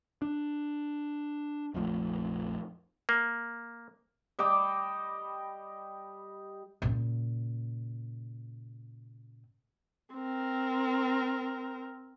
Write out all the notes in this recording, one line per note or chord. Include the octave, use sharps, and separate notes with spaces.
D4
A#1 F2 F3 A3
A#3
G3 D#5 G5 D6
A#2 C#3
C4 A#4